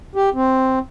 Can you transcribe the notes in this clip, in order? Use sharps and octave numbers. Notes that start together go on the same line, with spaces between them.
G4
C4